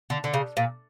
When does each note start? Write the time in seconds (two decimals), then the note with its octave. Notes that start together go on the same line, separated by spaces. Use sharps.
0.10 D3
0.24 D3
0.34 C#3
0.57 A#2